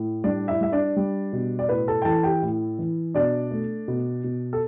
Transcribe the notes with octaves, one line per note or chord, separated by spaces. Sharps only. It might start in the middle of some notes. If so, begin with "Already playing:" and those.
Already playing: A2
G3 D4 D5
E4 E5
G3 E5
D4 D5
G3
B2
D5
A2 B4
A4 A5
G5
E3 A4 A5
G4 G5
A2
E3
B2 D4 D5
A3
B2
B2
A4